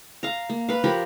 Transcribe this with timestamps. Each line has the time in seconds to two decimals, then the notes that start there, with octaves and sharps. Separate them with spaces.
0.23 F5 A#5
0.50 A#3
0.69 B4 F5
0.84 F3 G4 A#4 B5